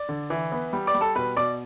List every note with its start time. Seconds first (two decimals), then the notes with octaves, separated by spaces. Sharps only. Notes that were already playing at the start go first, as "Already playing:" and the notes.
Already playing: D5
0.09 D3
0.30 E3
0.52 B3
0.73 G3
0.87 D5 D6
0.95 G3
1.01 A4 A5
1.15 B2 B4 B5
1.37 B2 D5 D6